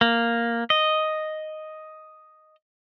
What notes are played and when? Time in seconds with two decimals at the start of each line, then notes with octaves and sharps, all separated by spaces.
0.01 A#3
0.70 D#5